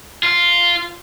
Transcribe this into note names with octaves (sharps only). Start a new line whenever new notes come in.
F4